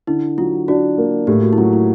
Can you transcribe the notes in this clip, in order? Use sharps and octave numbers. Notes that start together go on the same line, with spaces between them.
D3 E4
F#3 F4
D4 F#4
A#3
A2 G4
F#4
E4
F#3 F4
E4